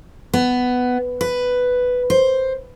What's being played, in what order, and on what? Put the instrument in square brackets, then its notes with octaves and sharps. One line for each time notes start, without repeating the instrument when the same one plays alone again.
[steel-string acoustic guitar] B3
B4
C5